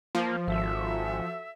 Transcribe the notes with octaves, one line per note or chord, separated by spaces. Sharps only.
F3 A#3
G#1 F#4 A4 E5